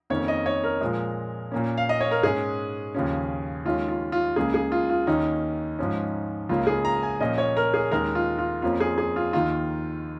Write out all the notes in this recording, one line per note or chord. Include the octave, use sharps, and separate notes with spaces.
F2 D#3 A#3 C#4 C#5
D#5
C#5
A#4
A#2 F3 G#3
A#2 A#3 C#4
F5
D#5
C#5
A#4
G#2 G#3 C#4 G#4
D#2 C#3 F3 C#4
D#2 D#3 G#3 C#4 F4
F4
F4
C#2 C#3 A#3 G#4
G#4
F4
F4
D#2 D#3 A#3 C#4 D#4
G#2 F3 C#4
C#2 C#3 A#3 C#4 F4
G#4
A#5
G#5
A#2 F3 A#3 C#4 D#5
C#5
A#4
G#4
D#2 D#3 G#3 C#4 A#4
F4
F4
F2 F3 A#3 C#4 F4
G#4
G#4
F4
D#2 D#3 A#3 F4